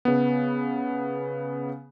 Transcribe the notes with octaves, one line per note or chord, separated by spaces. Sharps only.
C#3 B3